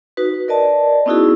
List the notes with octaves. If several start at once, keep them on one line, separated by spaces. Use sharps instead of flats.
D#4 F#4 B4
A#4 D5 D#5 A5
B3 C#4 D#4 E4 F#4 G#4